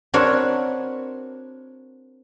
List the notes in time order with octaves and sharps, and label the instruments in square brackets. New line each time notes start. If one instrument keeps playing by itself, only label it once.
[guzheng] C4 D4 F#4 A#4 B4 C#5